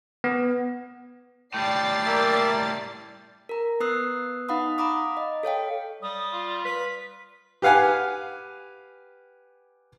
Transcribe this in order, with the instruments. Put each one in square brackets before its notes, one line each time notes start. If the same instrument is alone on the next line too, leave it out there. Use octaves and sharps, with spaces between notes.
[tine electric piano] B3
[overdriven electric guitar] A2 G3 [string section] D5 A6 C7 [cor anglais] G5
[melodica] A#3 E5
[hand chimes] A#4 A#5
B3 B4 D#6 E6 F#6 C7
D#4 F5 F#5 B5 D#6
F5 A#5 B5 D6 D#6
D#5
A4 C#5 F5 G5
[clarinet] G3 [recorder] D#6
[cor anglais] F4
[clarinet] B4 [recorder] B6
[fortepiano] G4 B4 F5 F#5 G#5